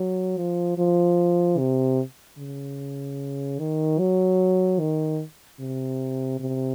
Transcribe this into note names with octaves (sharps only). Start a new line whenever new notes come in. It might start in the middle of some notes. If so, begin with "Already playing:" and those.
Already playing: F#3
F3
F3
C3
C#3
D#3
F#3
D#3
C3
C3